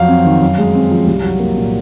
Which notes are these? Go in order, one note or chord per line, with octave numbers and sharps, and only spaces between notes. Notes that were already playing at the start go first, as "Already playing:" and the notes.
Already playing: F2 F#3 F5
C4
D#3
F#2
G#3
C4
F3
C2
F#3
A#3
A#2